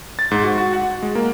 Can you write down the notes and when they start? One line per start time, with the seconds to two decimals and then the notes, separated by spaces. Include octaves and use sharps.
0.19 A6
0.31 G#2
0.44 F#4
0.58 F#4
0.73 F#5
1.02 G#3
1.15 A#3